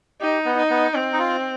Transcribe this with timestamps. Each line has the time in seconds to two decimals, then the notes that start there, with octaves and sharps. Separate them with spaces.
0.21 D#4 G4
0.45 B3
0.58 D#4
0.70 B3
0.95 C4
1.13 D#4
1.19 F4